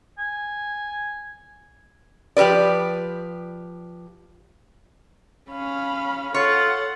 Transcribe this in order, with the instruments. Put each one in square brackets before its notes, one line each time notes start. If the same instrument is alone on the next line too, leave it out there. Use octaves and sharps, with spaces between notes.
[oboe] G#5
[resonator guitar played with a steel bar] F3 G4 A#4 B4 D5
[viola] C#4 [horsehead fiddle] F5 B5
[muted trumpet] F4 [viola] A4 F#5 [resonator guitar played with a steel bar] C#5